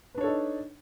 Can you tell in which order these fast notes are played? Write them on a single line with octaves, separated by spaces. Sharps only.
B4 D4 C#5 A4 D#4